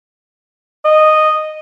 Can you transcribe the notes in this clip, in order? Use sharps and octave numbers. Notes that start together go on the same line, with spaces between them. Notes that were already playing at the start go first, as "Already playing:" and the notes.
D#5